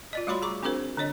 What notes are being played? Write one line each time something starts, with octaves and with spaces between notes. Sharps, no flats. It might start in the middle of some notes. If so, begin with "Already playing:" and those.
F4 D5 D#5
G3 A3 F#4 C#5 B5 C6
G#4 A#5 C#6 D6
C4 D4 F#4 G#4 A#4 C5
D3 D4 C#5 D#5